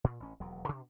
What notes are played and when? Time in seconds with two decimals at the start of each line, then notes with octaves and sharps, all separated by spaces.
0.04 A#2
0.20 A1 C#4
0.40 E1 D#2 F#3
0.65 B2 D4